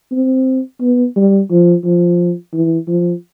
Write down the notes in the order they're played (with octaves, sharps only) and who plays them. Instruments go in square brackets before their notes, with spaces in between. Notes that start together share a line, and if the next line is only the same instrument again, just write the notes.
[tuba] C4
B3
G3
F3
F3
E3
F3